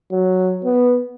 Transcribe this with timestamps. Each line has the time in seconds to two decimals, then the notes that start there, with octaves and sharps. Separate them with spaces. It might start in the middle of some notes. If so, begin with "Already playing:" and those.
0.12 F#3
0.64 B3